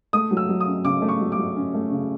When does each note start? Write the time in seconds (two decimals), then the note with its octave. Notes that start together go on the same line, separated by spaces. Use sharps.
0.13 A3 D#6
0.31 F#3
0.37 E6
0.49 F#3
0.60 D#6
0.67 C#4
0.85 C#3 D6
1.02 A3
1.08 C#6
1.20 F#3
1.32 D6
1.38 F#3
1.56 C#4
1.74 A3
1.91 C#3